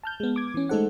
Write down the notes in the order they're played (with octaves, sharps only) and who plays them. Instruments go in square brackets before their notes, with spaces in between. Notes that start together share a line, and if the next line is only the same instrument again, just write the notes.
[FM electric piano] A5 F6 G6
G#3 B3
D6 G#6
E3 C#4
G#3 A3 D#4 A4 C5 F#5